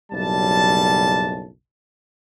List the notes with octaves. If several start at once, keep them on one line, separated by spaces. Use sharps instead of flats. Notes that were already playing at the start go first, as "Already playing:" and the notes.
F#1 B1 G3 A5